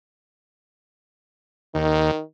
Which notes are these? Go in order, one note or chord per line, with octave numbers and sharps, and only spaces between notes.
D#2 D#3